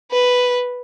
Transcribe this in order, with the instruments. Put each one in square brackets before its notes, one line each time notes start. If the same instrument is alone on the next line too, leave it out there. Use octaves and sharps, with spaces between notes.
[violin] B4